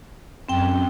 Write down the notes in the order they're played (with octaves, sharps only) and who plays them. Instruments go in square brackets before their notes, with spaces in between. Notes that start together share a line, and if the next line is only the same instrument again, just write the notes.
[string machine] F#2 [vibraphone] C4 G5